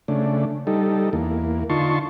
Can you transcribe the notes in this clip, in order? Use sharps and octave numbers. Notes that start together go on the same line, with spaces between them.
C#3 A3 D4
G3 D#4 A4
E2 A#3
D3 D#4 F4 A5 C6 C#6